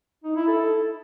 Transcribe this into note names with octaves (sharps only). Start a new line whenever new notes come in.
D#4
E4
A4